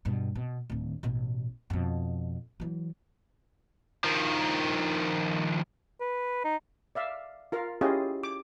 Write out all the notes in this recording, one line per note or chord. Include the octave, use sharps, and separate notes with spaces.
G2 B2
B2
D1 D#3
A1 B2
F2 B2
E3 F#3
D#3 F3
B4
D#4
D5 E5 F5
F4 A#4 F5
C#4 E4 F4 G4 G#4 D#5
D6